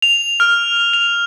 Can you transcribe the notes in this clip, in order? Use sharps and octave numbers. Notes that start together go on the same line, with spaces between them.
F7
F6
F7